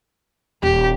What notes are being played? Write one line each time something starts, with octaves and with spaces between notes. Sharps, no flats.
D#1 G4